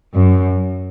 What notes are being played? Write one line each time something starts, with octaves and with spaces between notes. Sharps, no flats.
F#2